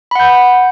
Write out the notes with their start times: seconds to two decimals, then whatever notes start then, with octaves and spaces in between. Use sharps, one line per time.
0.11 B5
0.15 F#5
0.20 G6